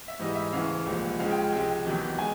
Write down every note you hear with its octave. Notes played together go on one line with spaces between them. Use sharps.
E5
G#2 E3 G3 D#5
E5
D2 C#3 E3 F5
C2 A#2 F3 G#3
C#2 C#3 F3 G#3 F5
G5
C#2 C3 F3 G#3 G5
E2 C3 D#3 F#3
G#3 G#5